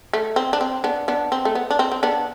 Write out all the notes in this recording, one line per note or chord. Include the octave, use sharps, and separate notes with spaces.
A3
C4
D4
C4
B3 D4
B3 D4
C4
A3
B3
D4
C4
C4
B3 D4